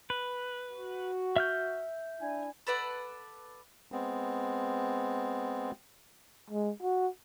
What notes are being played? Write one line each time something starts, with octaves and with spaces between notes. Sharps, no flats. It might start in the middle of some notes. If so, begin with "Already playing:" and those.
B4
F#4
E5 F6 G6
D4 E4 G#5
A4 B4 D5 F#5
G#3 B3 C4
G#3
F#4